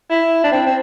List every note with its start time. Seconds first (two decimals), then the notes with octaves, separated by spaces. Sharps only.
0.10 E4
0.44 D4
0.52 C4
0.66 C4